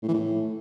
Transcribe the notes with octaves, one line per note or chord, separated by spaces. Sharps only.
A2
E3
A2